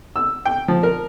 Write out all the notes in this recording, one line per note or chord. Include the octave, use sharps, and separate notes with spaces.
E6
G5
F3
A#4